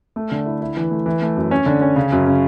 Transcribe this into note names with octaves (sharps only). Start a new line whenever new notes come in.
A3
D3
E4
E4
E3
A3
E3
A3
F#2
C#4
D3
C#4
C#3
F#2
C#3